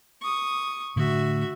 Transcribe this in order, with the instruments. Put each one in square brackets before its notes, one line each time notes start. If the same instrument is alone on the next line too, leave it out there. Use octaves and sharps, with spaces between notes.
[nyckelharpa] C#6 D#6
[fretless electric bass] A2 D3 A3 [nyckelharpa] F#4 E5